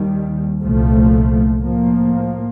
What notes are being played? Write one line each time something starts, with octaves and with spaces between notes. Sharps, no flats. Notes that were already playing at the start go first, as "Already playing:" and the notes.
Already playing: D#2 D#3 G3
C2 A#2 F3 A3
A2 F3 A#3